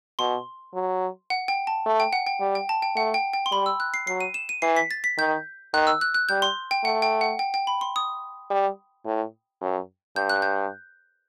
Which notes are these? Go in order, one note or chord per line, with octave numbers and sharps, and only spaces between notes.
B2 C6
F#3
F#5
G5
A5
A3
G5
F#5
G5
G3
G5
A5
G5
A3 F#5
G5
G5
C6
G3 B5
E6
F#6
C7
F#3 C7
D#7
E7
D#7
E3 C7
B6
A6
B6
D#3 G6
D#3 F#6
E6
F#6
F#6
G3 G6
C6
G5
A3 F#5
G5
F#5
G5
G5
B5
C6
D#6
G3
A2
F#2
G2 G6
F#6
G6